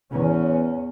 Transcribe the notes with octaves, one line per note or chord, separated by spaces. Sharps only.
E2 C#4